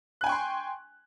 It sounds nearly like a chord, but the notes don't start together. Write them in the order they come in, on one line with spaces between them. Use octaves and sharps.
F#6 G#5 G5 C#6 C6